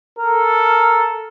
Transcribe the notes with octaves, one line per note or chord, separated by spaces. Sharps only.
A4 A#4